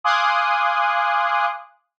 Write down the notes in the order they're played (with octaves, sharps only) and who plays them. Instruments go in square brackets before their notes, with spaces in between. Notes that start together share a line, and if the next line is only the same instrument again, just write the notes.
[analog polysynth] F5 G#5 C6 D6 D#6 F#6